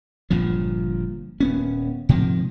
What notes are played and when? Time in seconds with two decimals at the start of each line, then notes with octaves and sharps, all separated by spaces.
0.30 G1 G2 A#2 F3
1.40 D#1 B3 C#4
2.09 G#2 C3 D#3 F3